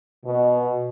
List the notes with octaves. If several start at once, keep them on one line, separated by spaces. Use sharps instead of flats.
B2